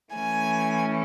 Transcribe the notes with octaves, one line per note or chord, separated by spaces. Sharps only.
E3 A3 C#4 G#5